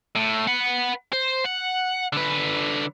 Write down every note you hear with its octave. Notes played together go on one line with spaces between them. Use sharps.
A2
B4 F#5
C5
F#5
D3 B4